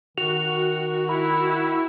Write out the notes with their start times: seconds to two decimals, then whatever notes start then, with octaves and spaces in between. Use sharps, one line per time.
0.18 D#3 F#4 F7
1.09 E4 B5